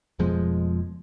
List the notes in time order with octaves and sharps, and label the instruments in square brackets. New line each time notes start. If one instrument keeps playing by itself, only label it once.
[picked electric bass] F1 B2 F3 G#3